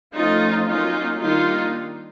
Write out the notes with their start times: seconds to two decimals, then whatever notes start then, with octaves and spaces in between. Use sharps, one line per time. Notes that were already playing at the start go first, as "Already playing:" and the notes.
0.14 F3 A3 C#4 D#4 F4
0.67 F#3 A#3 C#4 D#4 F4
1.21 D#3 G3 A#3 D4 D#4 F4